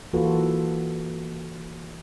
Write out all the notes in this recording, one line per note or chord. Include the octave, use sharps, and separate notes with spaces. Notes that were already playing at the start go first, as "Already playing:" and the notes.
E3 A#3 F4 F#4 A4 B4